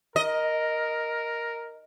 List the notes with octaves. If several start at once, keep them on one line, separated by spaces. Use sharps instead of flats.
A#4 D#5